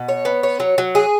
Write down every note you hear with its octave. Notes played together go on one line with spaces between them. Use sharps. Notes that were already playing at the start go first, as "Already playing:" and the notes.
Already playing: B2
C#5
B3
C#5
F#3
F#3
G#4